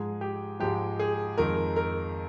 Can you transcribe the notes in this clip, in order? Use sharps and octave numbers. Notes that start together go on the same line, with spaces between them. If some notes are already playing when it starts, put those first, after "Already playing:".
Already playing: G#2 F3 G#3 G#4
G4
G#2 F3 G#3 G4
G#4
F2 D#3 G#3 A#4
A#4